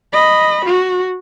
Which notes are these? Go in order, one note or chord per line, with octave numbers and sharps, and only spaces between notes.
D#5 B5
F#4